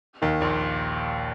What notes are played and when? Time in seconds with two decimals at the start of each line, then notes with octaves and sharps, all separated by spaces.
0.22 D#2 D#3
0.41 A#1 A#2